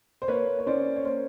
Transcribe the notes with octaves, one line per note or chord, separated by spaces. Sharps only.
C5
A#3 B4 C#5
C#5
C#4 C5 D5
C#5
A#3 C5